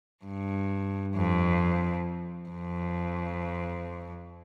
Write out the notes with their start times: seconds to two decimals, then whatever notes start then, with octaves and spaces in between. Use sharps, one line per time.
0.25 G2
1.15 F2
2.49 F2